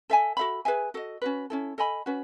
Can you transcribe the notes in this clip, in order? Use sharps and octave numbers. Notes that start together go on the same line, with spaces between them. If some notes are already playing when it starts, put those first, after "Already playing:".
A4 E5 G#5
F#4 A4 E5 B5
G#4 B4 E5 G#5
F#4 A4 D#5
C#4 F#4 B4
C#4 E4 A4
A4 D#5 G#5 B5
C#4 F#4 B4